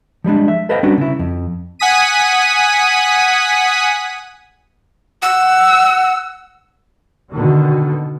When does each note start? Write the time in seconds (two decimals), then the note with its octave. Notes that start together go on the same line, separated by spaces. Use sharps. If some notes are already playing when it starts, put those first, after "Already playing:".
0.24 F3 G3 G#3 D4
0.48 E5
0.69 A4 B4 C5 D#5 F5 G5
0.83 G3 B3 C#4 D4 F#4
0.98 C#3 E4
1.19 F2
1.79 F#5 G#5 D#6 B6 D#7
5.22 F#5 E6
7.32 B2 D3 D#3